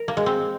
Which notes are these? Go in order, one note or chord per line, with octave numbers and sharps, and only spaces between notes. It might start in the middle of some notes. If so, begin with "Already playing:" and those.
Already playing: A#4
A#3
G#3
C4